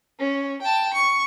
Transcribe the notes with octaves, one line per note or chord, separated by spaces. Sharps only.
C#4
G5 A5
C#6